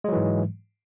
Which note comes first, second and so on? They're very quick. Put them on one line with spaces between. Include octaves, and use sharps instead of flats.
G#3 F#3 E3 G#2